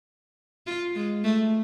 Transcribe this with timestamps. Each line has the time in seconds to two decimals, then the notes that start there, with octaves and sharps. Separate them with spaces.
0.66 F4
0.95 G#3
1.24 A3